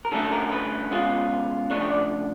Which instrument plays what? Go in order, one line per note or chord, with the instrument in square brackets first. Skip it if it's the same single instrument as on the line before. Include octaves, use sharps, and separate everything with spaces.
[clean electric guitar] A#4
D3 F#3 A3 C#4 A4
A4
A#4
A#4
B4
B2 G#3 C#4 F4
C#3 F3 A3 D4 C#5
C#5
D5